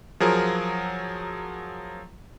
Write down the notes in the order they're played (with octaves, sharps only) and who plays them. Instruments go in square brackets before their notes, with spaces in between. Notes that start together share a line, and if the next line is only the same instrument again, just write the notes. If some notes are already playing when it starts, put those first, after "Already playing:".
[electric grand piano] F3 F#3 G#4 A#4